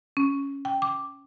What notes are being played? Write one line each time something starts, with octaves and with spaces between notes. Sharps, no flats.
C#4
G5
D6